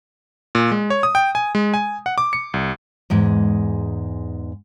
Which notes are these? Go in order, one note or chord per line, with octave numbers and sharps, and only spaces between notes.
A#2
G#3
C#5
D#6
G5
G#5
G#3
G#5
F#5
D6
C#7
C2
E2 G#2 G#3